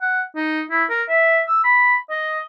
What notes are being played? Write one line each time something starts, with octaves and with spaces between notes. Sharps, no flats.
F#5
D#4
E4
A#4
E5
E6
B5
D#5